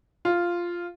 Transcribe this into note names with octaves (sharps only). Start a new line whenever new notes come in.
F4